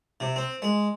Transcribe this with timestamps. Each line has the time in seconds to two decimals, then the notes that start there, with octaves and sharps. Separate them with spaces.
0.20 C3
0.36 C4
0.62 G#3